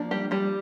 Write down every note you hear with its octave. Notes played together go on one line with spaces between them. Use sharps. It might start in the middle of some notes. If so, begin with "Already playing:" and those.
Already playing: F3 A#3 D4
G3 G4
G3 G4